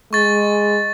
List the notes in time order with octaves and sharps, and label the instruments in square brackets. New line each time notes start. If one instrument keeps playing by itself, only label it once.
[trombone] G#3 [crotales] C#6 A6